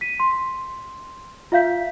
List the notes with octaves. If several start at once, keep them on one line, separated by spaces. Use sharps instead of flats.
B6 D#7
C6
F4 E5 F5 G6 B6